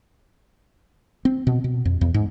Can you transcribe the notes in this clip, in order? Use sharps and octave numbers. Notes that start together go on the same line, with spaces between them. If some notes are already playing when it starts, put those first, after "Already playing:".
C4
B2
B2
F2
E2
G#2